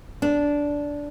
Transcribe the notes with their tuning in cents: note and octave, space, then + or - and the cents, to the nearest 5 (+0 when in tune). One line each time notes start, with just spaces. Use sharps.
D4 -10